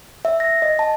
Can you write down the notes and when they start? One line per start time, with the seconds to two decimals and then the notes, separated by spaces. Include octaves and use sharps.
0.25 E5
0.40 A#6
0.62 D#5
0.79 A5